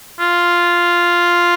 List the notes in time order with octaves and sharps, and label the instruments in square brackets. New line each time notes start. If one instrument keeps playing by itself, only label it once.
[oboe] F4